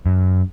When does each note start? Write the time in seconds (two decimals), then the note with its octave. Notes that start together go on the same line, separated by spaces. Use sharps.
0.06 F#2